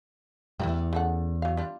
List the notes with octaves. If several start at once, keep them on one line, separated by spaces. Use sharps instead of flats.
E2 G#2 E4 F#4 G4
C#3 A4 F#5
F#3 F5
G3 D4 F4